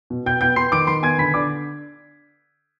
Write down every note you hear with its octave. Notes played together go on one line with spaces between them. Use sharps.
B2
B2 G5 G6
B3 G5 G6
B3 C6 C7
D#3 D6 D7
D#3 C6 C7
B3 G#5 G#6
D3 B5 B6
D3 D5 D6